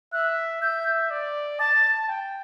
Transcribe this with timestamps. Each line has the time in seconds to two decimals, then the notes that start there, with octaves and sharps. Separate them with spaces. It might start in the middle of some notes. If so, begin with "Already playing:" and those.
0.13 E5 F#6
0.62 E5 G6
1.11 D5
1.60 A5 A6
2.09 G5